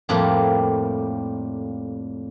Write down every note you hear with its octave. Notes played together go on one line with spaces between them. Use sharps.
F2 A2 G3 A#3